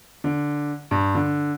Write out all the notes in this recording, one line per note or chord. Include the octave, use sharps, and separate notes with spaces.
D3
G2
D3